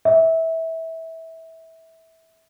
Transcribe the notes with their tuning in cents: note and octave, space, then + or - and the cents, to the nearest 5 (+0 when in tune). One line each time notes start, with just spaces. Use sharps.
E5 -20